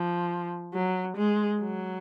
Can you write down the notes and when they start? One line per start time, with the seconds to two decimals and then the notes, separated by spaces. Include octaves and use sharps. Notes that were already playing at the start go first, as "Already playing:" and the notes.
Already playing: F3
0.73 F#3
1.16 G#3
1.60 F#3